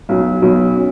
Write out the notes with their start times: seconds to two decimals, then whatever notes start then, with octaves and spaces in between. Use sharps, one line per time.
0.09 B1 B2 F#3
0.42 B1 B2 F#3
0.76 C#4